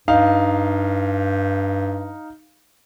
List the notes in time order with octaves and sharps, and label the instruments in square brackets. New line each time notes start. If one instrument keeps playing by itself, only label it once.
[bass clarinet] G2 [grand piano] D#4 F5